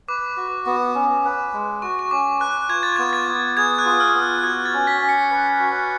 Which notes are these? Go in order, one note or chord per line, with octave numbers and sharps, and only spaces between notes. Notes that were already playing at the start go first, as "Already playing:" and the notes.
B4 D6
F#4
B3
C#4
B4
G#3
F#4 C#6
C#6
C#4 D6
B4 F#6
F4 G#6
A6
B3 G#6
A6
B3
G#4 G#6
F#6
F4
F6
B3
F#6
F#6
F#4 G#6
A6
C#4
B6
C#4 B6
C#7
B4
F#4